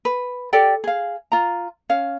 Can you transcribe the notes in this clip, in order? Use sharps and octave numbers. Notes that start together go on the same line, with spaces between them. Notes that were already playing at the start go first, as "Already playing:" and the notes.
B4
G4 A4 D5 G5
G#4 F5
F4 A#5
C#4 F5